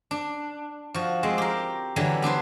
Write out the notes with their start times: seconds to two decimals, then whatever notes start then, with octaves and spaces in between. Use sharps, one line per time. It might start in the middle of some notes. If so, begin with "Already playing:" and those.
0.11 D4
0.94 F3 F#4
1.23 G#3 C4
1.38 G4 A#4
1.96 D3 E3 F#3 G3
2.22 B3 D4 B4 C5